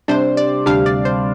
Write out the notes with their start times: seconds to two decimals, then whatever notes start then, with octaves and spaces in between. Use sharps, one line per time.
0.08 C3 G3 D4 C5
0.37 D5
0.66 D2 C3 G3 D4 F5
0.86 D5
1.05 C5